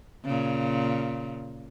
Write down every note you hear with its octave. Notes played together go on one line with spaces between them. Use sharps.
A#2 C#3